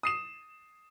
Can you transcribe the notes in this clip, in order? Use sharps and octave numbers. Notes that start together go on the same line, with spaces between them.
D#6 C7 E7